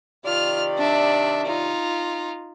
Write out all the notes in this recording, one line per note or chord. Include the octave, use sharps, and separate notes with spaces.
C3 D#3 F4 D5 F6
D4 E5
D#4 F4